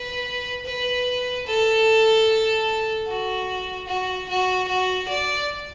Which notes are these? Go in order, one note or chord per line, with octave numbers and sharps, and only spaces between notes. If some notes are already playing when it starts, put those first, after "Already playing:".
Already playing: B4
B4
A4
F#4
F#4
F#4
F#4
D5